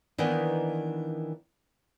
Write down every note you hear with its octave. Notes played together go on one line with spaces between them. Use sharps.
D#3 E3 A#3 B3 D4 D#4